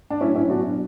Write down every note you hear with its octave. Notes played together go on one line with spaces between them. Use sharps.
D4
A2 F#3 C#4 E4
C#4 E4
B2 F#3 D4 F#4